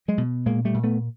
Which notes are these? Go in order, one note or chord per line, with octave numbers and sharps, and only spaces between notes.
F#3 G#3
B2
A#2 G#3 A#3
G3 A3
A#2
A3 B3